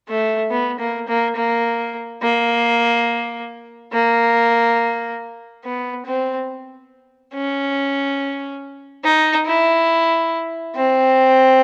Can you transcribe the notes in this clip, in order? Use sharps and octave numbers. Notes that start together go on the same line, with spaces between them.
A3
B3
A#3
A#3
A#3
A#3
A#3
B3
C4
C#4
D#4
E4
C4